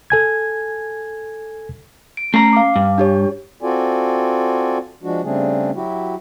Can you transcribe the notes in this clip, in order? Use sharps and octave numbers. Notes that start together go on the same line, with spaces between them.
A4 G#5 G#6
D7
A3 C#4 A#5 C7
F5 D6
G2
D4 G4 C#5
C4 F4 F#4 A4 D5 G#5
F3 G#3 D4 F#4
C#3 G3 A3 C4 D4 G#4
F#3 E4 F#4 G4